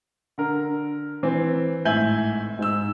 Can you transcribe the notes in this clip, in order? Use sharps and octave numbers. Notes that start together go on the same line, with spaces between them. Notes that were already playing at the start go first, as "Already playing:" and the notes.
D3 A#4
E3 C4
G#1 A2 E5 G#5 G6 F#7
G#2 E6